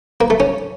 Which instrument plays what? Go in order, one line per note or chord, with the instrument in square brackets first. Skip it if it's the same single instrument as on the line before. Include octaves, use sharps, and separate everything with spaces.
[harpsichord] A#3
A3
C#4